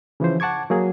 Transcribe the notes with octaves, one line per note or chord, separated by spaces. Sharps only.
C#3 E3 F3 C5
F#5 A5 C#6 D6 G#6
F#3 A#3 G#4